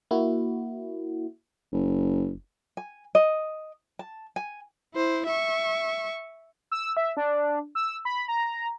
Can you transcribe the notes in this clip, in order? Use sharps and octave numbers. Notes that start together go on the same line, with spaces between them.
A#3 E4 F#4
F#1
G#5
D#5
A5
G#5
E4 C5
E5 C#6
E6
E5
D4
E6
B5
A#5